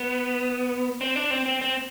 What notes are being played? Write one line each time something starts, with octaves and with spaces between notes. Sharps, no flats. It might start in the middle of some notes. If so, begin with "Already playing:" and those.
Already playing: B3
C4
D4
C4
C4
C4